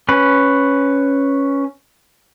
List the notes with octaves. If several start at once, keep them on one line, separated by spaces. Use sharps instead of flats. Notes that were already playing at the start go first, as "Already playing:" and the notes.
C#4 B4